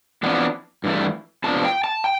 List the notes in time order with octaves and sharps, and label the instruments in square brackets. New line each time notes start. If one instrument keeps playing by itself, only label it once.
[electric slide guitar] F2 E3 B3 D4
G2 E3 A3
F2 C3 F3 B3 D4 A5
G5
A5
G5